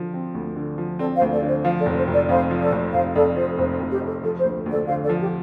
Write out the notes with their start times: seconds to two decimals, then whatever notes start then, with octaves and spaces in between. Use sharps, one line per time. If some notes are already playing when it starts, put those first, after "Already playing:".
Already playing: D3 F3
0.14 C4
0.35 D2
0.56 D3
0.78 F3
0.99 C4 A4 D5
1.16 C5 F5
1.21 D2
1.32 A4 D5
1.42 D3
1.48 C5
1.64 F3 C5 F5
1.80 A4 D5
1.86 F1
1.97 C5
2.08 F1
2.13 A4 D5
2.29 F2 C5 F5
2.51 F3
2.61 A4 D5
2.72 F1
2.93 F1 C5 F5
3.15 F2 A4 D5
3.36 F3 C5
3.58 F1 C5
3.81 F1
3.91 G4
4.01 F2
4.07 A4
4.23 F3 A4
4.39 C5
4.45 D2
4.66 D2
4.71 A4 D5
4.88 D3 C5 F5
5.04 A4 D5
5.09 F3
5.20 G4